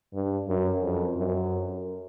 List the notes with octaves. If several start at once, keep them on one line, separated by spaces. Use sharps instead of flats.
G2
F#2
F2
F#2